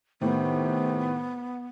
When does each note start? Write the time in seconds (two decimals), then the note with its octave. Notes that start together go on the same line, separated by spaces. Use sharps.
0.21 A2 C3 D#3 B3